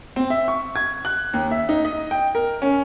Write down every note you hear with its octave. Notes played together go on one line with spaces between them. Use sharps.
C4
E5
C#6
G#6
F#6
D#2
E5
D#4
D#5
G5
A#4
C#4